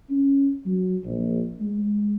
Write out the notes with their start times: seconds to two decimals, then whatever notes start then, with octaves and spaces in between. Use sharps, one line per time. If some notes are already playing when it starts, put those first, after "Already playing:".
0.10 C#4
0.66 F#3
1.05 A#1
1.61 G#3